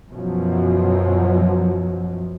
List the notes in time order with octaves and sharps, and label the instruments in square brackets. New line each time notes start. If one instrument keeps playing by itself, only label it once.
[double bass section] F#2 B2 F3 F#3